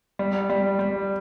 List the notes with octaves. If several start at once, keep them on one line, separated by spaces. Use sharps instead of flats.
G3
G3
G3